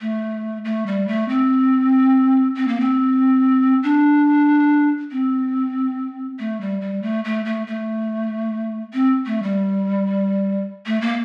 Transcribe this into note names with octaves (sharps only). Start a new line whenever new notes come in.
A3
A3
G3
A3
C4
C4
A#3
C4
D4
C4
A3
G3
G3
A3
A3
A3
A3
C4
A3
G3
A3
A#3